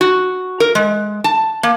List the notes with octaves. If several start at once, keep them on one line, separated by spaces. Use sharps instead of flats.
F#4
A#4
G#3
A5
A#3